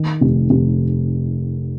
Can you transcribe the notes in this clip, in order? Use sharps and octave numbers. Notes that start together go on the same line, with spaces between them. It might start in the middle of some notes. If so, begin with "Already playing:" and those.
Already playing: D#3
F1
F1